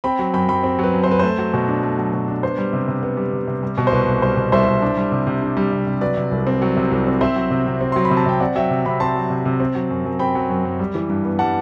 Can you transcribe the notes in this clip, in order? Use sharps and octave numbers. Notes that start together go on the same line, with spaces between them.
C4 G5 B5
F#3
F#2 G5 B5
F#2 G5 B5
C4
F#3 B4
F#2
C5
F#2 B4
A3 C5
F#3
B2
D4
A3
F#3
B2
D4
B3 C5
G3
C3
C3
B3
G3
C3
C3
G3
B2
C5
C2 B4
C2
G3 C5
B2
C2 C5 E5
C2
D4
G3
C3
C3
D4
G3
C3
C3
F#3 B4 D5
C3
C2
C4
F#3
C3
C2
C4
C4 C5 E5
F#3
C3
C3
C4
F#3 C6
B5
C3
A5
C3 G5
C4 D5 F#5
F#3 E5 G5
C3
C3 G5 B5
C4 A5 C6
F#3
C3
C3
C4
F#3
F#2
F#2
C4 G5 B5
F#3
F#2
F#2
G3
E3
G2
B3
G3 F#5 A5